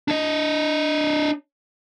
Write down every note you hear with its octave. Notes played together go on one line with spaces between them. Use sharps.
D4 D#5